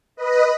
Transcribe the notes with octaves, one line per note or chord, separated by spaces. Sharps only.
B4 D#5